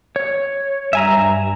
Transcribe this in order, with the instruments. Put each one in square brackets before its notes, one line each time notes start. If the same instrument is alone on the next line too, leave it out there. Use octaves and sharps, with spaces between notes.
[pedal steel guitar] C#5
[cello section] G2 [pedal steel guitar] E5 G#5 A#5